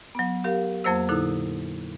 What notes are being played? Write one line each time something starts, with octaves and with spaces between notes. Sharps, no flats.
F#3 B3
G4 A#4 F5
F2 F#3 A#3 C5 E6
A#2 D3 D#4 E4 A4